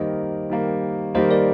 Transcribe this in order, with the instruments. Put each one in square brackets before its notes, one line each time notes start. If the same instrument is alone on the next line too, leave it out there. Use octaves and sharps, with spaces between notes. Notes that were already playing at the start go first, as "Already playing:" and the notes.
Already playing: [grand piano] D#3 G3 A#3 [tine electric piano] C5 D#5
[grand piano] D#3 G3 A#3
[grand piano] D#3 G3 A#3 [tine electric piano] C5 D#5
[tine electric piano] A#4 D5